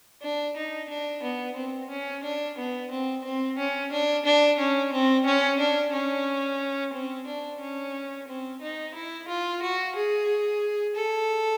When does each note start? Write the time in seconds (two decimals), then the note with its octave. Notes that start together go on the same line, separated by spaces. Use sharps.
0.22 D4
0.56 D#4
0.89 D4
1.23 B3
1.56 C4
1.90 C#4
2.23 D4
2.58 B3
2.90 C4
3.24 C4
3.58 C#4
3.92 D4
4.25 D4
4.59 C#4
4.92 C4
5.26 C#4
5.59 D4
5.93 C#4
6.93 C4
7.27 D4
7.61 C#4
8.28 C4
8.61 D#4
8.94 E4
9.28 F4
9.62 F#4
9.96 G#4
10.96 A4